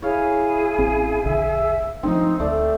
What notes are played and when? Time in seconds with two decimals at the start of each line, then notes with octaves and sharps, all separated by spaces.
0.02 E4 G#4 C#5 F5
0.78 A1 C4 C#4
1.25 E1 A#1 D3 E5
2.03 F3 A3 C4 D4 D#4
2.40 D2 A3 D5